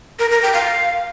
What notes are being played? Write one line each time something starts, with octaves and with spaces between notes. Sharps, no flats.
A#4
A#4
G5
F5